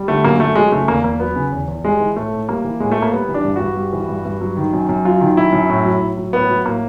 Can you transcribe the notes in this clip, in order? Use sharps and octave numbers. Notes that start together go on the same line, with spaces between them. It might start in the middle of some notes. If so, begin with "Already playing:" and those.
Already playing: G3
D3 A3
F#2 A#3
F#2 A3
F#3 G#3
C#3 A3
E2 A#3
E2 A#3
F#3 B3
C#3
E2
E2
G3 G#3
E3
A2 A3
A2
G3 A#3
E3
A2 G#3
A3
A2
A#3
G3 B3
E3
D4
G2
G2 F#4
G3
E3
G2
G2
F#3
D#3
F#2
F#2
F#3 F4
D#3
F#2 E4
F#2
A2
F#3
A2
F#3
A2 B3
F#3
A2 A#3